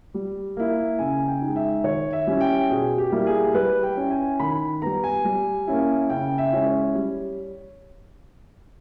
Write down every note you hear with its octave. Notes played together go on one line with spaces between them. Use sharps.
G3
A#3 E4
C#3 G#5
G5
D#4
G#3
E5
D#3 C#5
E5
G3 C#4 E4
G5
B2 G#4
G4
G3 A#3 E4
G#4
G3 B4
G5
C#4 E4
G#5
D#3 B5
G3 B3 A#5
G#5
G3
A#3 C#4 E4
C#3 G5
E5
G#3 C#4 E4
C#5
G3